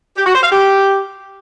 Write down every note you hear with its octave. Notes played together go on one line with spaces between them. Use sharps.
G4
F#4
C5
F5
G4